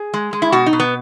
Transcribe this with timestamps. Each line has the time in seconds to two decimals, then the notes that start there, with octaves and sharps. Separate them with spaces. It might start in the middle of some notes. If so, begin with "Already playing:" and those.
Already playing: G#4
0.14 G#3
0.33 G#3
0.42 E4
0.52 B2 F#4
0.66 D#4
0.73 B2
0.80 B3